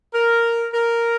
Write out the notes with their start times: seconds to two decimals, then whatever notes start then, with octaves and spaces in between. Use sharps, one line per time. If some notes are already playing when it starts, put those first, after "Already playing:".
0.14 A#4
0.72 A#4